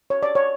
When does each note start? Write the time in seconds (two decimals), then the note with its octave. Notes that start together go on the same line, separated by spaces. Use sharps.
0.10 C#5
0.23 D5
0.35 C#5